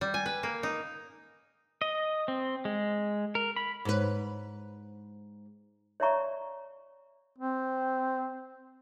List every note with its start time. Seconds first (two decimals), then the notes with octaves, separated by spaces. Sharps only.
0.01 G3
0.14 G#5
0.26 B4
0.43 A#3
0.63 D#4
1.82 D#5
2.28 C4
2.65 G#3
3.35 A#4
3.56 B5
3.85 G#2 B4
6.00 C#5 D5 E5 F5 A#5 C#6
7.38 C4